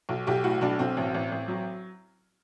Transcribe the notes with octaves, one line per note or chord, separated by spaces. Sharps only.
B1
B1 G4
A2 F#4
B1 D4
B1 C4
A1
A1
A1
F#3